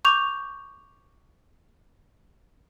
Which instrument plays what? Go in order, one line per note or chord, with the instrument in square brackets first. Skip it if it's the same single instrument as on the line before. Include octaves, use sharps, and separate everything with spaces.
[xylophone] C#6 D6 G6 F7